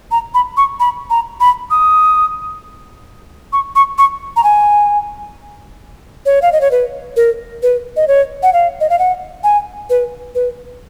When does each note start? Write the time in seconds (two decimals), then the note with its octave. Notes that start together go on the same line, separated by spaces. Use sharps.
0.11 A#5
0.34 B5
0.57 C#6
0.80 B5
1.10 A#5
1.40 B5
1.71 D#6
3.53 C#6
3.76 C#6
3.98 C#6
4.36 A#5
4.44 G#5
6.26 C#5
6.42 F5
6.52 D#5
6.61 C#5
6.71 B4
7.16 A#4
7.63 B4
7.96 D#5
8.08 C#5
8.43 F#5
8.53 F5
8.81 D#5
8.90 F5
8.99 F#5
9.44 G#5
9.90 B4
10.35 B4